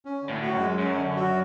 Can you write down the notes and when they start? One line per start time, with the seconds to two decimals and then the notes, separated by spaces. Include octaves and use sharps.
0.05 C#4
0.23 D3
0.29 A2
0.42 F#4
0.53 F#2
0.59 G#3
0.78 F#2 C#4
0.97 D3
1.16 F#4